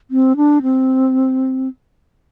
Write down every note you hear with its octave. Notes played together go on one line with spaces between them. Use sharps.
C4
D4
C4